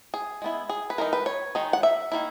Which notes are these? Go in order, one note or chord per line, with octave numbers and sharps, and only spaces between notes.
G#4
G#3 B3 E4
G#4
B4
E3 G#3 D#4 A#4
B4
C#5
D#3 G#3 D#4
F#5
E5
D#3 A#3 E4